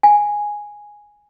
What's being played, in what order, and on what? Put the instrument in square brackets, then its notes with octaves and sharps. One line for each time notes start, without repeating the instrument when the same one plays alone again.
[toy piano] G#5